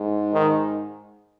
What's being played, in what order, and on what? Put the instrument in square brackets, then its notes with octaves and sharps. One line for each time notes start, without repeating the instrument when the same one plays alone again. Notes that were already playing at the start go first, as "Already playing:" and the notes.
Already playing: [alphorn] G#2
[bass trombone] D#3